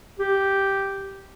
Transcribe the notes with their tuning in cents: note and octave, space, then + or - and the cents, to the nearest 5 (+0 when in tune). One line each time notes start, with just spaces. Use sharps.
G4 -5